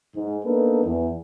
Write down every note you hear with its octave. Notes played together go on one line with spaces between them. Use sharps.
G#2
A#3 B3 D4 D#4 A4 B4
E2